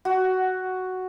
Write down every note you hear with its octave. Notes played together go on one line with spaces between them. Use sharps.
F#4